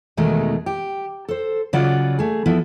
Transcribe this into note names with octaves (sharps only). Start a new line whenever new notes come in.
E2 B2 D#3 G#3 A3 D#4
G4
A4 C5
C#3 F#3 F4 D5 D#5 F#5
A3 G#4
F3 B3 E4 A4